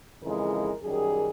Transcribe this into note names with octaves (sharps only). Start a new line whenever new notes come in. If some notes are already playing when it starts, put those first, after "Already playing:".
F2 C#3 E3 G#3 A#4
F#2 D#3 G3 G#4